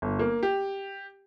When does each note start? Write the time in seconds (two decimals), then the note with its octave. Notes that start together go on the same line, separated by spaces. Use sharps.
0.02 G1
0.19 A#3
0.43 G4